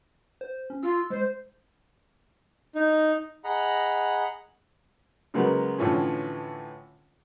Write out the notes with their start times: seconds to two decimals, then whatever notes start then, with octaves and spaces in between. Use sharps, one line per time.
0.41 C5
0.70 C#4
0.83 F4 E6
1.10 G#3 C5
2.75 D#4
3.44 G#4 D#5 F#5 A#5 B5
5.34 C#3 F#3 G#3 A#3 B3
5.78 A2 D3 E3 F3 C#4